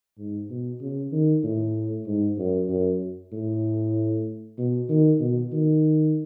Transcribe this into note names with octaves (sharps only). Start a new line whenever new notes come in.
G#2
B2
C#3
D#3
A2
G#2
F#2
F#2
A2
B2
D#3
B2
D#3